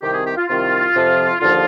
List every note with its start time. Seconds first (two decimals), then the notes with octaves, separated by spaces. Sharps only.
0.02 C2 C3 D#3 G4
0.13 G#4
0.26 G4
0.37 F4
0.48 C2 C3 D#3 F4
0.94 F2 C3 F3
1.40 D#2 D3 F3 F4